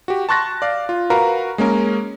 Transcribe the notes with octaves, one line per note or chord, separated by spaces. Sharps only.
F#4 G4
A5 C6 C#6 F#6 A6 A#6
D5 F5
F4
F#4 A#4 B4 F5 A#5
G#3 A#3 C#4 A#4